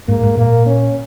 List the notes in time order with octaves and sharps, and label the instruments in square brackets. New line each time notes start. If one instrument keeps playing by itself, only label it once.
[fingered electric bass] G#2 [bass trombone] A#3
[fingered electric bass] G#2
[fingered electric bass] A#2 [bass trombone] A#3
[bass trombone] C#4